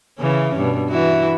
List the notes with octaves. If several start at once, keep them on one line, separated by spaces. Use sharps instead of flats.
C#3 E3 C#4
G2 B2
E3 E4 F#4